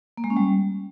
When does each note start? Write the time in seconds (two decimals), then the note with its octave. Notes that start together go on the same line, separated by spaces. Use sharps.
0.17 A#3
0.24 G#3
0.30 C#4
0.37 G3